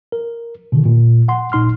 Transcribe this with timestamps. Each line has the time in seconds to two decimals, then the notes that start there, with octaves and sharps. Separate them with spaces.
0.12 A#4
0.72 B2 D3 D#3
0.85 A#2
1.28 F#5 C6
1.52 G#1 A#2 D#4 C6 F6